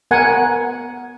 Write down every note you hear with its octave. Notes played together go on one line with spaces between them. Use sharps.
B3 A#4 F#5 G#5